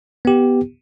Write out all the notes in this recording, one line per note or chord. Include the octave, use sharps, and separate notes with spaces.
B3 G4